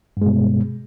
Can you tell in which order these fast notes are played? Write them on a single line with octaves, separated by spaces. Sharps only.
G2 G#3 B2